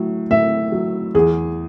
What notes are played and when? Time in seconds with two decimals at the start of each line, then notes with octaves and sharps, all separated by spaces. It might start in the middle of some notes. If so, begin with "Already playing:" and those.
Already playing: A2 F#3
0.30 A2 E5
0.72 F#3
1.15 E2 G#4